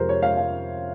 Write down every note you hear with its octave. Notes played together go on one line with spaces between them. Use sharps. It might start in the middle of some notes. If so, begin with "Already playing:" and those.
Already playing: F2 C3 F3 G#3 A#4 C5
C#5
F5
F5